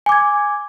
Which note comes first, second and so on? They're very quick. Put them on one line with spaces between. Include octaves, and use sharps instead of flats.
G#5 D6 G#6